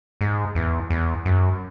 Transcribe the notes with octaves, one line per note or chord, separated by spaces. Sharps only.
G#2
E2
E2
F#2